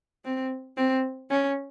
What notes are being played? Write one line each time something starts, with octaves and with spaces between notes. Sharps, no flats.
C4
C4
C#4